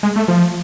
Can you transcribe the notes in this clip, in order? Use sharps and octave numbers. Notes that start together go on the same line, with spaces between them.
G#3
A3
F3